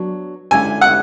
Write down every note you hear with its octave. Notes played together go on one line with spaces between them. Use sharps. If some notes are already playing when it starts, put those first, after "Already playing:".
Already playing: F#3 B3 D4
D3 G#3 C#4 E4 G#5
F#5